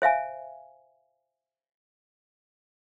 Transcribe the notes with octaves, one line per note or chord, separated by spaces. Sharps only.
C5 E5 F5 G#5